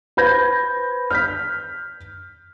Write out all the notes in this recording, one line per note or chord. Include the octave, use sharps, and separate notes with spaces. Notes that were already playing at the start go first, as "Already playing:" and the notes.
B4 C5 B5 G6 G#6 A#6
F6 G6 B6